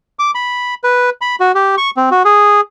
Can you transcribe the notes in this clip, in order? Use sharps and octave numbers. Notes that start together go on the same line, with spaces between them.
D6
B5
B4
B5
F#4
G4
C#6
C4
F#4
G#4